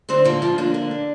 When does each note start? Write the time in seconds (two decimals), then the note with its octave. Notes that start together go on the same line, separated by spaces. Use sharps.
0.09 D3 C4 C5
0.25 F3 A#3 A#4
0.42 D3 F3 F4
0.58 A#3 D4
0.74 D3 D4
0.91 D3